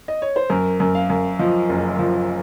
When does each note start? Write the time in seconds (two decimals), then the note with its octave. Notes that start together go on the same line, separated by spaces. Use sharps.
0.08 D#5
0.22 C#5
0.36 C5
0.49 F#2 A#4
0.80 F#2
0.95 F5
1.10 F#2
1.39 F3 D#5
1.69 F#1
1.99 F3